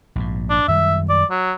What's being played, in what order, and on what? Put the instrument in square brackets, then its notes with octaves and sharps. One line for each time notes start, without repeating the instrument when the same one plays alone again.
[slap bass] A#1 G#2
[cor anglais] D4
[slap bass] F#2 D#3 G3 [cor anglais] E5
[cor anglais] D5
F#3